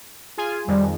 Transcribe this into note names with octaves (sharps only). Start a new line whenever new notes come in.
F4 G#4 G#5
F2 D#3 G3 G#3